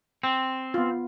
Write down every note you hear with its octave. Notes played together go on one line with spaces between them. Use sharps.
C4
B3 F4